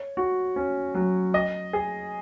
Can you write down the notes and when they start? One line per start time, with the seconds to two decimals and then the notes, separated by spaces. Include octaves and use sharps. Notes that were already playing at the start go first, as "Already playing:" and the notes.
Already playing: C#5
0.17 F#4
0.56 C#4
0.94 F#3
1.34 D#5
1.73 G#4